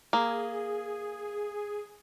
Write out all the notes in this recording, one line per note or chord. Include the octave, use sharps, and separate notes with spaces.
A#3 G#4